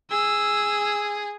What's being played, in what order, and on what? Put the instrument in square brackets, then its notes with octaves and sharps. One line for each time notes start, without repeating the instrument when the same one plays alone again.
[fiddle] G#4 [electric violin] E6